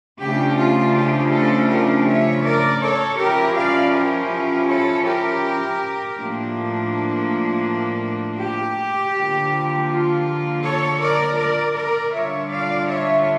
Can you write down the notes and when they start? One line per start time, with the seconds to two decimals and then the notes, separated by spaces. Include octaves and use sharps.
0.20 C#3 F3 A3 D4 G4
0.58 F4
0.95 G4
1.31 F4 A4
1.69 G4 A#4
2.06 C#5 E5
2.43 A#4 D5
2.81 A4 C#5
3.18 F3 C#4 E4 G4 A#4
3.55 D5 F5
3.92 G4 A#4
4.67 A4 C#5
5.04 G4 A#4
6.16 A2 F3 A#3 D4
8.40 G4
9.14 D3 F3 A#3
9.89 F4
10.63 A4 C#5
11.00 A#4 D5
11.37 A#4 D5
11.75 A#4 D5
12.12 D3 G3 D4 F4 C#5 E5
12.50 D5 F5
12.87 C#5 E5